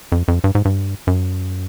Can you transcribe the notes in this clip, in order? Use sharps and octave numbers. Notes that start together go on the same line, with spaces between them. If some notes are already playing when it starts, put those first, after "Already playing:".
F2
F2
G2
G#2
G2
F#2